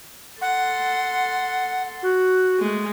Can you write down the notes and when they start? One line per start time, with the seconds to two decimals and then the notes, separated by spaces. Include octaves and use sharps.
0.41 A4 F#5 C6
2.02 F#4
2.59 G#3 A3